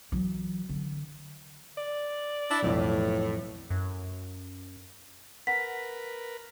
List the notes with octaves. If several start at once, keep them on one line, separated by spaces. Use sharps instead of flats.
E3 F#3
D3
D5
D4 E4
B1 F2 A2 E3
F#2
A#4 B4 F#5 B6